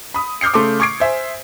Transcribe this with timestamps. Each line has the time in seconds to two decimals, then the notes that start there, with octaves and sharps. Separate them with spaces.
0.14 B5 D#6
0.41 D6 F6 G6 C7 C#7
0.54 C#3 A3 C6 D6
0.80 C#6 D6 G#6 C7 D7
1.00 C5 E5 G#5